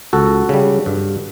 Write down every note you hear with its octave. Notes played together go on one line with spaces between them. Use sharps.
C#2 F#4 A4
C#3 G3
G2